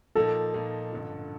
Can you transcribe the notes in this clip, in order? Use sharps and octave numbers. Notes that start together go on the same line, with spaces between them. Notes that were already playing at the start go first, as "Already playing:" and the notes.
A#2 F3 A#3 D#4 A4
A#2 F3 A#3 D#4
A1 G2 D3 F3